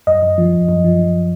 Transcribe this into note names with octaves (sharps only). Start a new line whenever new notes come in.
F#2 D#5
F#2
F3
F#2
F#2
F3
F3